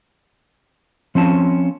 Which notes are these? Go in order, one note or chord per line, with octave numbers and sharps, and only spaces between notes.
F3 C4 C#4 A5